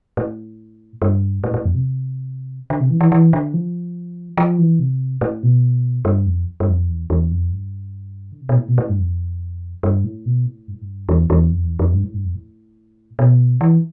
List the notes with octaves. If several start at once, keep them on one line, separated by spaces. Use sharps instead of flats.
A2
G2
A2
A2
F2
C3
D3
C3
E3
E3
E3
D3
F3
F3
E3
C3
A2
B2
G2
F2
G2
F2
E2
E2
F2
G2
D3
C3
B2
A2
B2
A2
G2
F2
G2
A2
B2
A2
G2
A2
G2
E2
E2
F2
E2
F2
G2
A2
G2
F2
A2
B2
E3